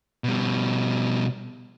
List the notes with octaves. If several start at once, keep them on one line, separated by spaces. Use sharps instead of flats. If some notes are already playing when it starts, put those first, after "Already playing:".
B2 G3